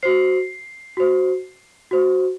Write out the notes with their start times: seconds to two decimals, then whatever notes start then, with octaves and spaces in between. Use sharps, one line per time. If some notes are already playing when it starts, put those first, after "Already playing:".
0.03 F#4 C5 C7
0.97 F#4 C5
1.91 F#4 C5